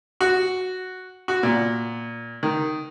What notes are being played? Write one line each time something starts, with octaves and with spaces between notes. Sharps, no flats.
F#4
F#4
A#2
D#3